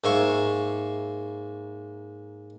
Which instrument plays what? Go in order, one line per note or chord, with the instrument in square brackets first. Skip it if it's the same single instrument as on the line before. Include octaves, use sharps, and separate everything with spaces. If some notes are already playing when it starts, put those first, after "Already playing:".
[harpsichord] G#2 A#3 E5 F5 C#6